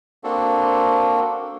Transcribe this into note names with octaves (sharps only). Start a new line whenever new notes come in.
A#3 C4 D4 F#4 A4